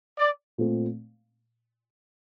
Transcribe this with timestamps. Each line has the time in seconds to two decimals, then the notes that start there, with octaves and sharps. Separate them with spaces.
0.19 D5
0.58 A#2 A3 C4